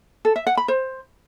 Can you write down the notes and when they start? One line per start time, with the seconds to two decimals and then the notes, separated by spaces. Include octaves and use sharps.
0.25 A4
0.36 E5
0.47 F#5
0.57 B5
0.68 C5